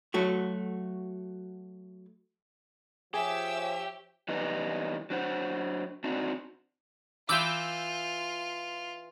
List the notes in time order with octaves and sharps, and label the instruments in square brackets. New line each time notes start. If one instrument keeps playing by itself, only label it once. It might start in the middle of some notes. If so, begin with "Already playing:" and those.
[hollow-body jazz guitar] F#3 A3 F#4
[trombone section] F3 [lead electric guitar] G4 [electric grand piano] G#4 G#5 [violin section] C#5 E5 E6
[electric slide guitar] E3 G3 B3 D#4
F#3 D4 C5 F#5
C4 D4 D#4 F#4
[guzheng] E3 E5 [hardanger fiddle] F4 [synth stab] D6 E6 G6